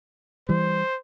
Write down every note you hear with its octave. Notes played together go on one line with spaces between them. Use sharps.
E3 G3 C5